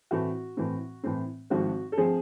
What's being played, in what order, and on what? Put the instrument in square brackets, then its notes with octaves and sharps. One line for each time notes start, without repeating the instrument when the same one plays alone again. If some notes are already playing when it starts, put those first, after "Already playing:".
[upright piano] A2 E3 A3 C4 F#4
A2 E3 A3 C4
A2 E3 A3 C4
G#1 G#2 F3 A3 C4 F#4
A4
F3 A3 C4 G#4